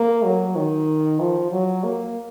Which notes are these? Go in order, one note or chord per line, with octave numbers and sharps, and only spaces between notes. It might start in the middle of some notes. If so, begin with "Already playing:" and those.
Already playing: A#3
F#3
D#3
F3
F#3
A#3